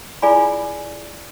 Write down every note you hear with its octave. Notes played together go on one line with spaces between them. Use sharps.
E4 F4 G#4 D5 G#5 B5